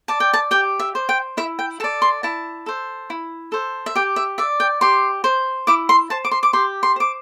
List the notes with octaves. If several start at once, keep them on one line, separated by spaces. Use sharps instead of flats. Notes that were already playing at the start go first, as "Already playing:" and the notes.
D5 A5
G5
A5
G4 G5
E5
C5
G5
E4 E5
G5
A4 D5 A5
C6
E4 A5
A4 C5
E4
A4 C5
E5
G4 G5
E5
D5 E5
G5
G4 C6
C5
E4 D6
C6
C5 A5
D6
C6
D6
G4 C6
C6
C5 D6